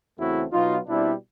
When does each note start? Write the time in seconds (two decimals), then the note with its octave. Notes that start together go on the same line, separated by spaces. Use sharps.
0.17 E2 C#3 E3 A3 C4 E4 F#4
0.52 B2 F#3 B3 D#4 F4
0.87 B2 G3 C4 D4 E4